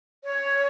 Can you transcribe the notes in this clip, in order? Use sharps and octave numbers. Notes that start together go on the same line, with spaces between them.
C#5